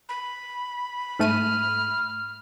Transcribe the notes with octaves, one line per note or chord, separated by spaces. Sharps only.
B5
G#2 A3 F6 D#7